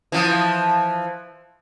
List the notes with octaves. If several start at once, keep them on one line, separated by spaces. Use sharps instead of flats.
E3 F3